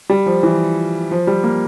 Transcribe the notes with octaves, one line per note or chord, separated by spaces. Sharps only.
G3
F3
E3
F3
G3
A#3